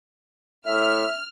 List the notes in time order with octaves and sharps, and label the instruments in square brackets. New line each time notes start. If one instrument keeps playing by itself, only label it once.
[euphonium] A2 [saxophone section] E5 [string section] F6